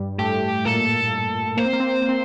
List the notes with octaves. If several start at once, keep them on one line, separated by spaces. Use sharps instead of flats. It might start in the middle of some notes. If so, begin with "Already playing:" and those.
Already playing: G2 G3
A2 A3 G4
A#2 A#3 A4
A#3 C5
C4
A#3
C4
A#3
C4
A#3
C4